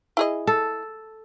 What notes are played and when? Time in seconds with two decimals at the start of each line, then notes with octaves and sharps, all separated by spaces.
0.17 E4 G#4 D#5
0.47 A4